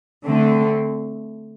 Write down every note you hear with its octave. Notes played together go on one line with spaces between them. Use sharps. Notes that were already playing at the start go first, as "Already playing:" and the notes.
D3 A3 C4